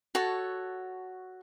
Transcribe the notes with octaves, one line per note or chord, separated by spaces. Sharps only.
F#4 A4 C#5 A5